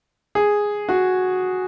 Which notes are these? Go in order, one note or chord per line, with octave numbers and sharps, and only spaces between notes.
G#4
F#4